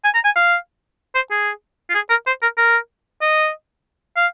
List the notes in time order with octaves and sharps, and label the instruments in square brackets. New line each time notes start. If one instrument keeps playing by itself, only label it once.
[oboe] G#5
A#5
G#5
F5
C5
G#4
F4
G#4
A#4
C5
A#4
A#4
D#5
F5